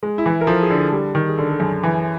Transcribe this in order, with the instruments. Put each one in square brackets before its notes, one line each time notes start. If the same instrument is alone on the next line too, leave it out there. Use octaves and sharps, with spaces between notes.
[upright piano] G#3
[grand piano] E4
[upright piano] E3
[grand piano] A#4
[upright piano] F3 [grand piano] A4
[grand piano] G#4
[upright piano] D3
[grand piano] A4
[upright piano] G3
D#3
[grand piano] G#4
[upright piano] D3 [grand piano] A4
[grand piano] A4
[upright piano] F#2 [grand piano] G#4
[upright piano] E3